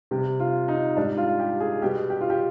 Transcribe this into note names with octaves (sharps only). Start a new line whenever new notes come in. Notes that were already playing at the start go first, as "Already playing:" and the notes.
C3 G3 G4
F4
D#4
G#2 G3 D4
F4
G4
G#4
B2 G3 G4
G4
F4
G4